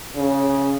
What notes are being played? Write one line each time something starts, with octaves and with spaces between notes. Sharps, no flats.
C#3